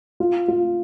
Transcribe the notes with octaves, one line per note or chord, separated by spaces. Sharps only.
F4
F4